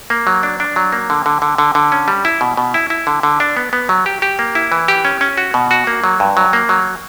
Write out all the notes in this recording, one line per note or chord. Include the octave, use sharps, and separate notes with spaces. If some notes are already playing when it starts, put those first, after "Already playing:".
A#3
F#3
D4
D4
F#3
A#3
D3
D3
D3
D3
D3
C#4
G3
E4
B2
B2
E4
E4
D3
D3
D4
B3
B3
F#3
G4
G4
A#3
E4
E3
G4
C#4
C#4
F#4
B2
F#4
A#3
F#3
G2
F#3
A#3
F#3